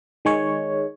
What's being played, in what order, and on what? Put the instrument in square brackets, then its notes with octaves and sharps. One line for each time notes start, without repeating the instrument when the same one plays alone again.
[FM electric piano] D#3 G#3 C#5